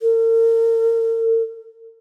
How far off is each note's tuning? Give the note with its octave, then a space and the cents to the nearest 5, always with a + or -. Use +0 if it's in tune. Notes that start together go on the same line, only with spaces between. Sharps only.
A#4 -40